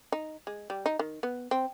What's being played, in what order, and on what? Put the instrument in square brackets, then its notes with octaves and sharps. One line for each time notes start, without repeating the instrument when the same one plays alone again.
[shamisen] D#4
G#3
G3
D#4
D#3
B3
C4